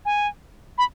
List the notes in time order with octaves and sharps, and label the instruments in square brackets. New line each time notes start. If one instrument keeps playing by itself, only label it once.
[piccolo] G#5
B5